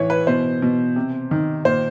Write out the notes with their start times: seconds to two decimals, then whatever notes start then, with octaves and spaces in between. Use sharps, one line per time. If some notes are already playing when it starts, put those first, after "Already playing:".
Already playing: A2 E3 C#5
0.10 B4
0.27 B2 C5
0.62 B2
0.96 C3
1.31 D#3
1.65 A#2 C5